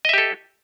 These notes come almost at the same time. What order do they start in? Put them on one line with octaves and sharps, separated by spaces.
D#5 E5 G4 A4